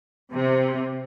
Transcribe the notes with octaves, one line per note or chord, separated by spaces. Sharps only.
C3